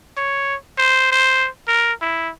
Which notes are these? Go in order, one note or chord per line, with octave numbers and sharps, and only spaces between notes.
C#5
C5
C5
A#4
E4